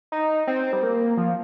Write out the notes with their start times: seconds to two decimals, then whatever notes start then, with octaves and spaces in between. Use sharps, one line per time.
0.12 D#4
0.47 C4
0.73 G3
0.83 A#3
1.17 F3